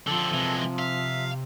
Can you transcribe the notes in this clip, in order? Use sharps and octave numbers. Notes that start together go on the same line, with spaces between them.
D3 F3 C4 A4
C3 E3 G#3
E5 F5